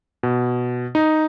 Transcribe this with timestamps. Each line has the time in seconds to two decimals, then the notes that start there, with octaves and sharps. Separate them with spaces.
0.23 B2
0.95 D#4